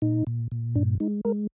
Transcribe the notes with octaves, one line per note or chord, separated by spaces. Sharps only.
A#2 D#4
A#2
A#2
G2 D4
G#3 D#4
G#3 A#4